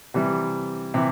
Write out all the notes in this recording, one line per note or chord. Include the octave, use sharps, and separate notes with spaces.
C3 E3 G3
C3 E3